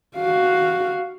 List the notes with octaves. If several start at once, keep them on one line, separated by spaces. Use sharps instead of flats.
F#4 F5